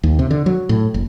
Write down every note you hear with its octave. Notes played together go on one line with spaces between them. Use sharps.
D#2
C3
D3
F#3
A2
F#1